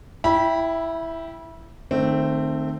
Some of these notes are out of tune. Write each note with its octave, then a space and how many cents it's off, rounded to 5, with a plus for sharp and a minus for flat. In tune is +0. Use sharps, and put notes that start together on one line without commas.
E4 +0 G5 +0 B5 -25
D#3 -30 A3 +10 C4 +0